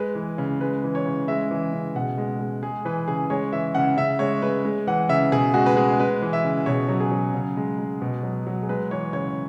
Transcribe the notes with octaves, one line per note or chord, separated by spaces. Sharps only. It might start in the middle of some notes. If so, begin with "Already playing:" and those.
Already playing: G#3 B4
E3
C#3
G#3 B4
E3
C#5
C#3
G#3 E5
E3
C#3
B2 F#5
G#3
G#3
G#3 G#4
E3 B4
C#3 G#4
G#3 C#5
E3 E5
C#3 F#5
C#3 E5
G#3 C#5
G#3 B4
G#3
E3 F#5
C#3 E5
B2 G#4
G#3 F#4
B4
G#3 G#4
G#3 B4
E3
E5
C#3
B2 C#5
F#3
G#4
F#3
C#3
G#3
G#3
B2
F#3
F#3
G#4
G#3 B4
E3 C#5
C#3 C#5